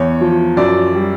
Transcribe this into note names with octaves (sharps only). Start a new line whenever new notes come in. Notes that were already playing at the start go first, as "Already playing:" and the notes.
Already playing: E2 C#5
F3
F#2 D5
G3